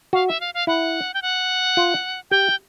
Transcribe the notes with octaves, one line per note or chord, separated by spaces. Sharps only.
F#4 F5
E5
F5
F5
E4 F#5
G5
F#5
F4
G4 G5